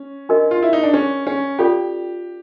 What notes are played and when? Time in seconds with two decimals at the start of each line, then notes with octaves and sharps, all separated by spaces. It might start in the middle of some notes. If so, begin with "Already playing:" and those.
Already playing: C#4
0.29 D4 F#4 A#4 D#5
0.51 F4
0.63 E4
0.73 D#4
0.83 D4
0.93 C#4
1.27 C#4
1.59 C#4 F4 G4 A4 D5 F5